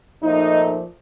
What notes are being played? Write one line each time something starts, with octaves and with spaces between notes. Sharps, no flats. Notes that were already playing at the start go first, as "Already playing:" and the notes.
A#2 F3 A3 D#4